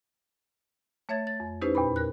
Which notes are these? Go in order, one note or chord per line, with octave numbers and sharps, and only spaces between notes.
A3 C#5 E5 G#6 A6
A6
F2
C#4 D#4 E4 G4 B4 C5
E2 A#2 B4 B5
A#4 F#6